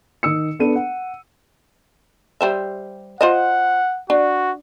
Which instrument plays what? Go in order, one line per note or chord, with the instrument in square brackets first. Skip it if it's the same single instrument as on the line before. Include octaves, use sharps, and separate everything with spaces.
[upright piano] D#3 D#6 E6 C#7
B3 D4 A4 D#7
F#5
[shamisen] G3 C5 E5
[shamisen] F4 C5 D#5 [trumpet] F#5
[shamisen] D4 [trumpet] F#4